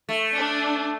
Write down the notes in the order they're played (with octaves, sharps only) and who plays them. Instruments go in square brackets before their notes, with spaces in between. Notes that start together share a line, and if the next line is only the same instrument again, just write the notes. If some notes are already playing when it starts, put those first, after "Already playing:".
[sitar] A3
[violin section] D4